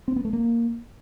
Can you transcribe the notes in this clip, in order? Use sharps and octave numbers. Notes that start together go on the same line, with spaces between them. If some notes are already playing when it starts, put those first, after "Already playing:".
C4
B3
A3
A#3